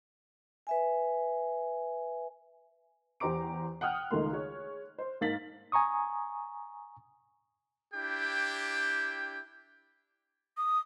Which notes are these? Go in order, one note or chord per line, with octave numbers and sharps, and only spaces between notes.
B4 E5 G#5
E2 G4 C5 A#5 D6 D7
F#5 G5 D#6 F6 F#6
C#2 D#3 A3 A#3 C6
G#4 C#5
C5
G#2 A#3 F5 A6 B6 F#7
G#5 A#5 C#6 D#6
D4 E4 G4 G5
D#6